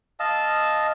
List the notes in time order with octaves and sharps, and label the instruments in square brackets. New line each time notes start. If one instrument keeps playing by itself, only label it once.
[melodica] D#5 F5 A5 E6